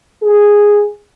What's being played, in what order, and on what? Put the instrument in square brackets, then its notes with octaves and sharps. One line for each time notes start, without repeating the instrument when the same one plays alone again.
[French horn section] G#4